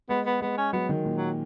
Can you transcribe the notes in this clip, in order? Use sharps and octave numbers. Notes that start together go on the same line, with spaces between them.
G#3 B3
B3
G#3 B3
C#4
F#3 B3
D#3
A#2
F#3